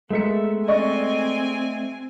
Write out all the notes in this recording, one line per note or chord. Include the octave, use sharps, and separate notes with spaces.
G#3 A3 B3 A#4 E5 C#7
C4 D5 D#5 G#5 C#6